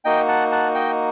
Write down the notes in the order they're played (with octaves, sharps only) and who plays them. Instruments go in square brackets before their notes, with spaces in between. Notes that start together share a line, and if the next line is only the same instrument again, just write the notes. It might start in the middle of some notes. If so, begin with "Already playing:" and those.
[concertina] A#3 D#4 F#4 D#5 G5
F#5 A5
F#5 A5
D#5 G5